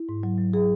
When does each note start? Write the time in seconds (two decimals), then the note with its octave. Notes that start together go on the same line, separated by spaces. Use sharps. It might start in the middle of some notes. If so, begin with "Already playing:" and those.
Already playing: E4
0.09 G#2
0.23 F#3
0.38 F#3
0.53 F#3 G#4